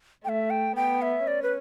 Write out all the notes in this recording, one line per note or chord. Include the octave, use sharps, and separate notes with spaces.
A3 E5 G5
G5
B3 G5
E5
C#4 D5
B4